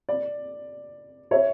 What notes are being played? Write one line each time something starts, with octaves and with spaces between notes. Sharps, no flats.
D5
C#5 E5